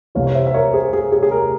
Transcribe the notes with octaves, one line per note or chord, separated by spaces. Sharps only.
C2 C3 E3 C#5 F5
C#5
C5 E5
E5
A#4 C#5
G#4 C5
G#4
G#4
G#4
A#4